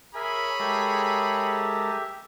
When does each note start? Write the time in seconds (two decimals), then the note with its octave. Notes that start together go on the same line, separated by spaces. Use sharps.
0.15 G#4 A#4 C#5 E5 G#5 B5
0.59 G#3 G4 A4 A#4 E5